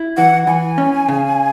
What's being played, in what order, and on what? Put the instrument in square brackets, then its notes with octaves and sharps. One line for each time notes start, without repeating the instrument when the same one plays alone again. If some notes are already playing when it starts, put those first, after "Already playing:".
Already playing: [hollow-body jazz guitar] E4
[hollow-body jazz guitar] E3 [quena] F#5
[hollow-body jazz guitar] E3 [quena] G#5
[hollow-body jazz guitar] C#4
C#3